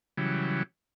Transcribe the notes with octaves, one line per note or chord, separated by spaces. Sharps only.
C#3 E3 F#3 G3